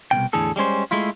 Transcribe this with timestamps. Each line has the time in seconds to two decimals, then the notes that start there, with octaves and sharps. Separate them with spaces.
0.11 C2 F#2 B2 G5
0.33 E2 A2 D3 G#4 A4
0.56 G3 G#3 C#4 C5
0.91 G#3 A3 E4 F4